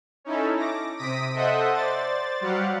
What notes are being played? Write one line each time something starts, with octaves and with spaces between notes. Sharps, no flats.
C#4 D#4 E4 A4
D6 A#6
C3 D#6 A#6 B6 D7 D#7
A4 C5 D#5 E5 F#5 D#6
C5 D5 A6
F#3 G3 G4 F5 F#5